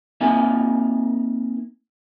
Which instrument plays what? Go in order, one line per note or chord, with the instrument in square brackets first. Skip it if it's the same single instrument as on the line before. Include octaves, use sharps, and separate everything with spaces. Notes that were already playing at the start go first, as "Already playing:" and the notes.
[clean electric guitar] A#3 C4 D#4 A#4 E5 G#5